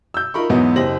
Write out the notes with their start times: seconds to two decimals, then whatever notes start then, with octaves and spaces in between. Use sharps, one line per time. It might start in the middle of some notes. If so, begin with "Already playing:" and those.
0.14 E6 G6
0.34 D#4 F4 A#4 B5 C#6
0.50 E2 G#2 F#3 B3 D#4
0.76 F#1 G4 C5 D#5 A#6 F#7